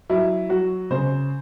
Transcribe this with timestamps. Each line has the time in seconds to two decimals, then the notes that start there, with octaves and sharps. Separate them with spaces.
0.10 F#3 E4
0.49 F#3 F#4
0.91 C#3 C5